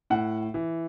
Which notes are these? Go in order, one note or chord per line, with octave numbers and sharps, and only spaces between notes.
A2 F#5
E3